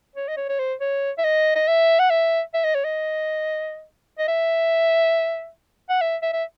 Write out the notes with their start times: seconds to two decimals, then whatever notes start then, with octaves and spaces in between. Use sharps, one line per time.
0.15 C#5
0.28 D#5
0.37 C#5
0.49 C#5
0.59 C5
0.81 C#5
1.18 E5
1.24 D#5
1.55 D#5
1.67 E5
1.99 F#5
2.10 E5
2.54 E5
2.64 D#5
2.75 C#5
2.84 D#5
4.19 D#5
4.28 E5
5.89 F#5
6.01 E5
6.22 E5
6.33 E5